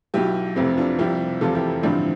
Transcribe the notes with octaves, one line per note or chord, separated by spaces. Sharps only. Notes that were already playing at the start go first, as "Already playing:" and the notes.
B1 B2 E4 G4
F1 F2 C3 C4 E4
D4 F4
C2 C3 F3 E4 G4
F1 E2 C3 F3 F4 A4
E4 G4
A1 G2 D3 F3 C4 E4